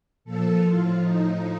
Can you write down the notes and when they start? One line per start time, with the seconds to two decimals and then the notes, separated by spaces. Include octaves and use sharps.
0.25 A#2 F3 A4
0.62 A2 F3 F4
0.98 A2 F3 D#4